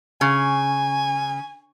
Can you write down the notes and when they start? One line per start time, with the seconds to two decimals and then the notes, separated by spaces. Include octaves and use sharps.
0.21 C#3 G#5